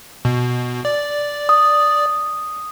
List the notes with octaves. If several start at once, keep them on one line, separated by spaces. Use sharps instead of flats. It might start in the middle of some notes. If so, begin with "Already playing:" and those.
B2
D5
D#6